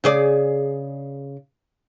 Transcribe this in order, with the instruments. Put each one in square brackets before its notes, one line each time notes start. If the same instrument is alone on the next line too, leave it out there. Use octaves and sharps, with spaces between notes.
[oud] C#3 G#4 D5